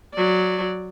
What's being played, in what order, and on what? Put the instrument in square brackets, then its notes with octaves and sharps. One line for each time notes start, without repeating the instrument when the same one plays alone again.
[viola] F#3 D5